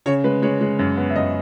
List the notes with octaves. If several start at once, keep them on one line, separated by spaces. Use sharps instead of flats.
C#3 C#5
G#3 B4
G#3 C#5
G#3
F#2
B3
E5
F#2 D#5